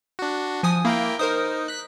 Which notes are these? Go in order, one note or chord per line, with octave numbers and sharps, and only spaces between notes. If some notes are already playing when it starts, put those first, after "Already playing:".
D4 F#4
F3 G#5 D#6
A#3 E4 A#4 G5
D#4 A#4 C5 D#6
F#6 B6